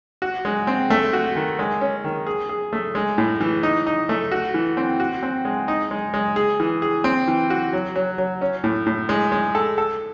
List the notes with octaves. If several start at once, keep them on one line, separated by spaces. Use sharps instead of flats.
F#4
G#3
C4
A3
F#4
D#3
G#3
C#4
D#3
G#4
G#4
A3
G#3
A2
E3
D#4
D#4
A3
F#4
E3
C4
F#4
C4
G#3
D#4
G#3
G#3
G#4
E3
G#4
C4
E3
F#4
F#3
F#3
F#3
C#4
A2
A2
G#3
G#3
A4
A4